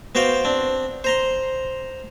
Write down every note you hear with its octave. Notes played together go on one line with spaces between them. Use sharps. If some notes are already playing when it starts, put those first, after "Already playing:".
B3 F#4 C5 F5 G5
C4 D4
C5 A#5 C6